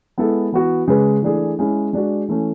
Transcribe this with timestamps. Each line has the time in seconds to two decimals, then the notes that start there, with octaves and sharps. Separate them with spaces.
0.18 G#3 B3 E4 A4
0.52 E3 B3 F#4
0.87 C#3 G#3 C#4 G#4 B4
1.22 E3 A3 D4 G#4
1.59 G#3 C#4 E4
1.93 G#3 D4 F#4
2.28 E3 A3 C#4